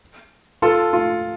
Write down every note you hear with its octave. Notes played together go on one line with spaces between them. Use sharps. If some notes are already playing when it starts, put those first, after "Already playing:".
F4 A4
F4